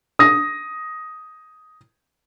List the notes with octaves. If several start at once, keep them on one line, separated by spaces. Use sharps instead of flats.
D#6 A#6